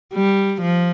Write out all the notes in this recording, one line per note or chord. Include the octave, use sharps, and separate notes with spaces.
G3
F3